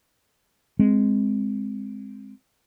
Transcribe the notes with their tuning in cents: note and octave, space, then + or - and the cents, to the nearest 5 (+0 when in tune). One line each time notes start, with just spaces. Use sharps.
G#3 +0 C4 +0